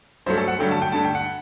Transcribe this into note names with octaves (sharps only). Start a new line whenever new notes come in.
G2 F#3 A3 C5
A4
F#5
G2 D3 F#3 A3 G5
A5
G5
G2 D3 A3 A5
G5
F#5